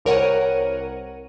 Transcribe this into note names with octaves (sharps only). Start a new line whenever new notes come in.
C2 A#4 C#5 F#5 D#7